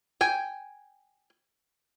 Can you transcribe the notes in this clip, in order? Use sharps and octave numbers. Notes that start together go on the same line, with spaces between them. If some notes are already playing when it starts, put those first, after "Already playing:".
G5 G#5